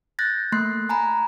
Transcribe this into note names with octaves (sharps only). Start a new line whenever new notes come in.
F#6 G6 A6 A#6
A3 A#3 C6 F#6 C7
G#5 A#5 B5